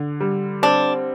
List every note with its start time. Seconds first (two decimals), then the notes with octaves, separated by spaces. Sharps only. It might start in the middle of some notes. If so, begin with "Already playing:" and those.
Already playing: D3
0.21 G3
0.63 C4 D4